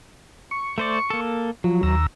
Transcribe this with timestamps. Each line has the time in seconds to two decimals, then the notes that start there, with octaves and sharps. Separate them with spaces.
0.51 C#6
0.78 A3 C5 D5
1.10 A#3 A4
1.64 F3 F#3
1.83 D#2 A#5 E6